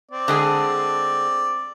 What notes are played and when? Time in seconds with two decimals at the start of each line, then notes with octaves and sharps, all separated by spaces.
0.11 C4 D5
0.28 D3 G#3 G#4